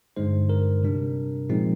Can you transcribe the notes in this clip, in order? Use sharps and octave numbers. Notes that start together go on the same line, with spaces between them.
G2 D3 G#3 D#4 C5
A#4
C3 G3 D4
A#2 F3 G#3 C4 D#4